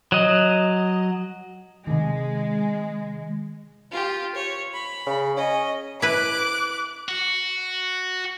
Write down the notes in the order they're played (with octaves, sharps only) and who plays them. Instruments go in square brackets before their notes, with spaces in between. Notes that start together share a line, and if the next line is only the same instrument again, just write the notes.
[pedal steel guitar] F#3 D#5
[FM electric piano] C3 D#3 [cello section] G#3
[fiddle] F4 G4
C#5
B5
[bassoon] C#3
[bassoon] C#4 [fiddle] D#5
[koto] E4 B4 [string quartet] D6 F#6
[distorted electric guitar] F#4